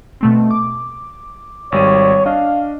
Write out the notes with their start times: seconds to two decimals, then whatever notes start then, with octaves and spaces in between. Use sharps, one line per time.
0.21 B2 A3 C4
0.51 D6
1.72 G#1 G3 C#5 D#7
2.26 D4 D#5 F5